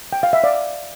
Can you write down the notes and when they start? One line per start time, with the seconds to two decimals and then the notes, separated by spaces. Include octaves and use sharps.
0.13 G5
0.23 F5
0.33 E5
0.44 D5 F5